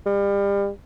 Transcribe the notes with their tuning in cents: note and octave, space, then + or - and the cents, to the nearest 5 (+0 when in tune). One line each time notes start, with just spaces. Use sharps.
G3 +35